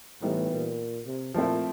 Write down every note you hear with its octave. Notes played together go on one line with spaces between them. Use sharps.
A2 E3 G3 B3 D#4
A#2
C3
A#2 F3 A3 C4 E4